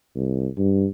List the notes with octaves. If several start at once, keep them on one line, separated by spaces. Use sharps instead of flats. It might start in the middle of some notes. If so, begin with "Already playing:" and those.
C2
G2